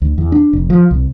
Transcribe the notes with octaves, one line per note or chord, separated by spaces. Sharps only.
D2
E2
D4
F1
F3
C2